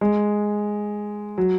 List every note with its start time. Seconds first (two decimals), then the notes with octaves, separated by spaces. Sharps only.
0.01 G#3
1.38 F#3